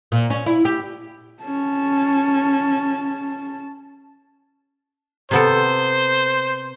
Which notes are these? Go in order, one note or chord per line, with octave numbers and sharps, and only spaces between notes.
A#2
C#4
E4
G4
C#4 A5
C3 B3 A4 C5